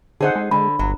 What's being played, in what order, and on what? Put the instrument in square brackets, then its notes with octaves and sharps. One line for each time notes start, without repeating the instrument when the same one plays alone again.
[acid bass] D3 [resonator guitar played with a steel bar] D#4 G#4 [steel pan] A4 C5 F#5
[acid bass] G#3
[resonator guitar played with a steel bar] D3 [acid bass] G#3 [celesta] B5
[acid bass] G1 [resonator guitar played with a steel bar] F#3